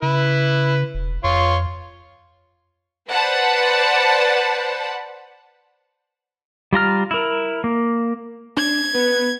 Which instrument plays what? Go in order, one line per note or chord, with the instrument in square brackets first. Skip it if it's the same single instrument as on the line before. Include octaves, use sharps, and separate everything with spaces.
[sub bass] C#3 [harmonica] E4 B4
[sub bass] E1
[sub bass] F2 [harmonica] F4 C#5 C6
[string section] B4 C5 D5 F#5 A5 B5
[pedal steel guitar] G3 F4 A#5 F6
E4 A#4
A#3
[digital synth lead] D4 [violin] G#6
[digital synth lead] B3 [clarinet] B4